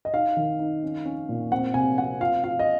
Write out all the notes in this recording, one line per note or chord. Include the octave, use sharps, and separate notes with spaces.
D#5
D#4 F5
D#3
D#4
C#4
C#4
A#2
C4 F#5
C3 G#5
C4 F#5
F4 F5
F4 F5
D#5